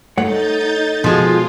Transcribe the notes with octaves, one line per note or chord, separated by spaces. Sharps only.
A3 D#4 C#5 F#5 G6 A6
B2 F3 G#3 F4